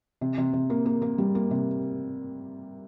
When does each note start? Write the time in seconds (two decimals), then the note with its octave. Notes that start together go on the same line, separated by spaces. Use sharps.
0.21 C3
0.38 C3
0.53 C3
0.70 A#3
0.86 A#3
1.02 A#3
1.18 G3
1.35 A#3
1.51 C3